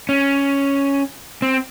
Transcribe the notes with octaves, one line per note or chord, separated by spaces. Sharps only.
C#4
C4